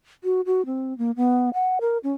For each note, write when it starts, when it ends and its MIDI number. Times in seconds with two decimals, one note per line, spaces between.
0.24 0.41 66
0.46 0.65 66
0.66 0.96 60
0.98 1.11 58
1.16 1.50 59
1.54 1.79 78
1.81 1.98 70
2.03 2.13 61